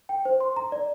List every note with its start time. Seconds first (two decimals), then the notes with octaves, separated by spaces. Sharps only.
0.09 G5
0.25 C5
0.40 C6
0.56 A#5
0.72 D5